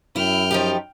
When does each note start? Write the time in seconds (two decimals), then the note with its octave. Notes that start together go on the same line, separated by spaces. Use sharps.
0.16 F#2 E4 G5 F6
0.51 F3 D#4 G4